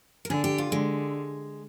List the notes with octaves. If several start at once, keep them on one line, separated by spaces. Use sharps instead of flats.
A#4
D3 G#4
G4
F4
D3 G#3